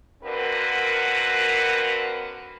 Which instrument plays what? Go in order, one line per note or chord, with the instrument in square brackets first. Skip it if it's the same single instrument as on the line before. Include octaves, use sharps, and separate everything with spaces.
[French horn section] D3 A#3 C4 F#4 A#4 B4